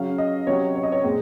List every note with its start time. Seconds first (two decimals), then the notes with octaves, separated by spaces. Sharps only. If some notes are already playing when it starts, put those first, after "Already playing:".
Already playing: C#3 F#3 C#4 F5
0.18 D#5
0.47 C3 F#3 C#4 C#5
0.75 C#5
0.83 D#5
0.92 C#5
1.03 A#2 G#3 C4